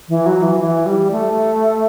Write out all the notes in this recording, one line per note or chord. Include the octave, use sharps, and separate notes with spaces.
E3
F#3
E3
E3
G3
A3